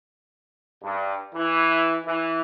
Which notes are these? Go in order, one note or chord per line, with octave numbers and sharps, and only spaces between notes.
G2
E3
E3